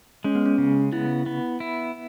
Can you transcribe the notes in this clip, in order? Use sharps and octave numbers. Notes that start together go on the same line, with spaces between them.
G#3 C#4
B3
C#4
C#3
B3 E4
B3
E4